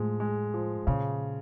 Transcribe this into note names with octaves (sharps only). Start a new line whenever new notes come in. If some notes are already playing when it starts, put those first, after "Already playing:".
Already playing: A2 F3 G#3
G#3
F3
A#2 C#3